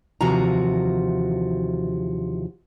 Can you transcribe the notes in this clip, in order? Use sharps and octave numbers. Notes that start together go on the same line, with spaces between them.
D#2 C3 E3 F3 F#4 A#5